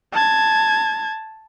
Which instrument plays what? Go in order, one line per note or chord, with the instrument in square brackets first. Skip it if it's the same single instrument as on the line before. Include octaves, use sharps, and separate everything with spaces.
[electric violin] A5 G#6